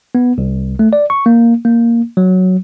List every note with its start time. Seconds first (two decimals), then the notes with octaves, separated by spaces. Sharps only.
0.15 B3
0.38 C2
0.79 A3
0.93 D5
1.10 C#6
1.26 A#3
1.65 A#3
2.17 F#3